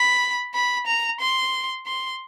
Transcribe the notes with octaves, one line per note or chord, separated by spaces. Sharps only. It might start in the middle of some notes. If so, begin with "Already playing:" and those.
Already playing: B5
B5
A#5
C6
C6